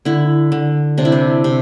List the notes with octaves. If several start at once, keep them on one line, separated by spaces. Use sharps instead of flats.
D3 E4
D3
C3 D4
E4
D4
C3